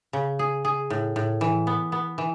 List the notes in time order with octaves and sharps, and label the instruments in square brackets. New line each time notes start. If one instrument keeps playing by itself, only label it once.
[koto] C#3
G#4
G#4
A2
A2
E3
B3
B3
E3